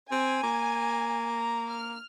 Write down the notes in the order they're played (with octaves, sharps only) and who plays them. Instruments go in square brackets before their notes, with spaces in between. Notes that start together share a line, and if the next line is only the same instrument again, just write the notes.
[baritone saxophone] C4 [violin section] G#5
[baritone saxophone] A#3
[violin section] A#5
F6